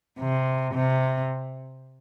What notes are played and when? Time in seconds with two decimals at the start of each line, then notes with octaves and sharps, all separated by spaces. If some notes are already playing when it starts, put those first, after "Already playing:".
0.19 C3
0.73 C3